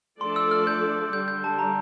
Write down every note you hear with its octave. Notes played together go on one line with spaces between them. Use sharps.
F3 A3 D4 A4 D5 C6
E6
F6
G6
D3 G3 D4 G6
G6
A5
A#5